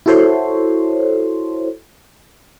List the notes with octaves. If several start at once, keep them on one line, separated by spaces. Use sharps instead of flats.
E4 F#4 A4 C5 C#5 C6